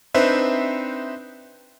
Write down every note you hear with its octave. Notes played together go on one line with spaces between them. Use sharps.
C4 D4 D#4 B4 C5 E5